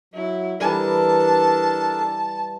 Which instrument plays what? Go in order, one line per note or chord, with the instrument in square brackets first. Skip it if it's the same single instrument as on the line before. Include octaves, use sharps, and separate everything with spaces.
[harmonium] F#3 [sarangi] E4
[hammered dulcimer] E3 G3 [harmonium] D4 A4 A#4 [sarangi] A5